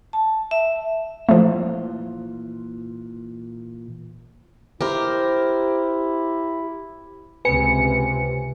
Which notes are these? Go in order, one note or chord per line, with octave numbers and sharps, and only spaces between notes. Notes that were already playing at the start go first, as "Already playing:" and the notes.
A5
E5
A#2 E3 F3 A3 F4
E4 G4 A#4 C5
C#2 C3 B4 G#5 C#7